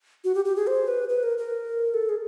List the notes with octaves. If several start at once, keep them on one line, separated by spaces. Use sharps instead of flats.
F#4
G4
G4
G#4
C5
B4
B4
A#4
A#4
A4
G#4